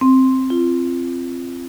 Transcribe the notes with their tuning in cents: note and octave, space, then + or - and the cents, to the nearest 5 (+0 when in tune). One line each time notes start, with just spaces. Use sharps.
C4 +5
F4 -25